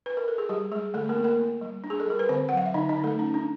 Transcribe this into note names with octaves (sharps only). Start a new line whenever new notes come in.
B4
A#4
A4
G#4
G3 G4
G3 G#3 G#4
D3 A3 A4
A#3 A#4
B3
A#3 A#4
B3
G3
D4
G#4
A4
G3 A#4
B4
D3 C4 C5
F#3 F#5
F5
E5
D3 D#4 D#5
D#4 D#5
D3
A3 A4
C#4 D#4
D4